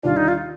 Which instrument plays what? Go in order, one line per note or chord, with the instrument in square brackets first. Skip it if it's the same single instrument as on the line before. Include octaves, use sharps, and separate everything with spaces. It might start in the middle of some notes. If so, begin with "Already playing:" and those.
[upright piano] D#2 D3 G3 D4 [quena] F4
[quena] D#4
F4